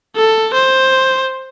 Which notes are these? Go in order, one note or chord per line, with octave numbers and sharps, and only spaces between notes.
A4
C5